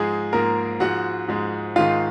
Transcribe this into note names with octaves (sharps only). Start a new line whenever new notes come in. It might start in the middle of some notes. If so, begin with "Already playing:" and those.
Already playing: G#2 F3 G#3 G#4
G#2 F3 G#3 A#3 A#4
G#2 F3 G#3 F#4 F#5
G#2 F3 G#3
G#2 D#3 G#3 F4 F5